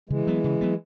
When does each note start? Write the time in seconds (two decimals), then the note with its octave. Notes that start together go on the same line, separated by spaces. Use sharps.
0.09 C#3 E3 G#3
0.27 F#3 B3
0.44 C#3
0.61 F#3 B3